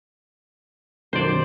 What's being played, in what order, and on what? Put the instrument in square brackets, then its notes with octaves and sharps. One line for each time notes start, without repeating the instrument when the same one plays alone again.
[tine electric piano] F#2 B2 D#3 [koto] C5 D5